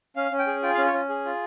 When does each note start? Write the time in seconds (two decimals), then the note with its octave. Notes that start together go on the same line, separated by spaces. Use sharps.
0.16 C#4 F5
0.31 C#4
0.39 G5
0.47 G#4
0.63 F4 G5
0.74 F5
0.78 C#4
0.86 C#5
0.94 C#4
1.09 G#4
1.25 F4